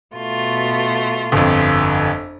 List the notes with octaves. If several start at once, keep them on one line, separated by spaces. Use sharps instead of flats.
B2 A3 F4
G1 F2